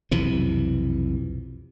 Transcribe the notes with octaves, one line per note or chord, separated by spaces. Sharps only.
B1 F2 C3 E3